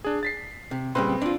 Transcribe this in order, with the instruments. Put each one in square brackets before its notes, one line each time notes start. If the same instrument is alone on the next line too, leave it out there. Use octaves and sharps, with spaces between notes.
[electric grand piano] D4 G#4
A6 B6 C7
[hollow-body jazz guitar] C3
[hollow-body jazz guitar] A#2 C#3 G3 [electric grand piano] C4 B4 C6
[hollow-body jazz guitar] D4 F4